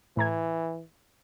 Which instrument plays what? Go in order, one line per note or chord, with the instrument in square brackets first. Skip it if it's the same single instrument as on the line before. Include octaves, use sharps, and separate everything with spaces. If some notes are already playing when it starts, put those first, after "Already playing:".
[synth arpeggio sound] A2 A#5 G#6 [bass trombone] E3